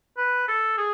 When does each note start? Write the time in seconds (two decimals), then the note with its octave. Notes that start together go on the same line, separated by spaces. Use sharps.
0.17 B4
0.48 A4
0.77 G#4